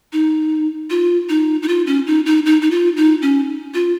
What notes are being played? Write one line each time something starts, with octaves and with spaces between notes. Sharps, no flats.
D#4
F4
D#4
D#4
F4
C#4
D#4
D#4
D#4
D#4
F4
D#4
C#4
F4